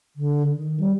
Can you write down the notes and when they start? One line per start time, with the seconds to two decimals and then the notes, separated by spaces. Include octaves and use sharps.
0.16 D3
0.54 D#3
0.80 G3